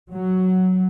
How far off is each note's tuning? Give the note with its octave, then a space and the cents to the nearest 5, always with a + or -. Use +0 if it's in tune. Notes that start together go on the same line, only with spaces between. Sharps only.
F#3 +5